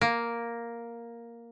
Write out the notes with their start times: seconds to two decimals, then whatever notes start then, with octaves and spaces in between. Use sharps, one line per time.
0.01 A#3